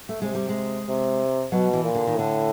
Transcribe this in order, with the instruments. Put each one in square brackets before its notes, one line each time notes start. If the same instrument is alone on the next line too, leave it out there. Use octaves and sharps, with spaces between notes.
[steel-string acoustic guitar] A3
[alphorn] C3 [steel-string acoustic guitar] G#3
[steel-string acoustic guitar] G3
G#3
[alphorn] C3
[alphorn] B2 [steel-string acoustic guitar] F#3
[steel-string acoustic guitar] E3
[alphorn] A#2
[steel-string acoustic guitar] D3
D#3
[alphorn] A2 [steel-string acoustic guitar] D3